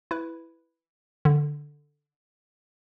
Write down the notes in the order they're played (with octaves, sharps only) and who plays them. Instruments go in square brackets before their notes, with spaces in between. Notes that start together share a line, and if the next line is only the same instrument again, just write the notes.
[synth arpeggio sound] E4 B4
D3